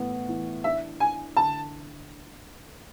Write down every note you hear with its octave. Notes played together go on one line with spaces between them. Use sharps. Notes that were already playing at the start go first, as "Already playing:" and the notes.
Already playing: A2 E3 B3
E3
D4 E5
D4 G#5
D3 A5